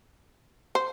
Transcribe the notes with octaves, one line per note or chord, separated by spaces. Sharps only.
C5